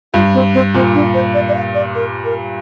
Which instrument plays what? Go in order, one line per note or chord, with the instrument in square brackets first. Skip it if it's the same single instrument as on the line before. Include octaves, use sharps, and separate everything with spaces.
[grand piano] G2 [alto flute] F4
[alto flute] C4
C4
[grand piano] A#2 [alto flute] C4
[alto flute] D4
C5
D5
D5
F5
D5
A#4
A#4